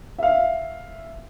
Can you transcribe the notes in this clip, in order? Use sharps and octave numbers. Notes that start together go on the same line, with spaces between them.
E5 F5